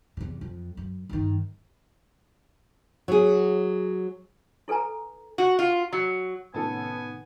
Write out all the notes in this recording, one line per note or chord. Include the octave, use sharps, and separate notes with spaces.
E2 C3
F2
F#2
G2 D#3
F#3 G#4
E4 A4 B4 G#5 A#5
F#4
F4
F#3
A2 C3 D#3 B3 C#4 A4 G#5 A5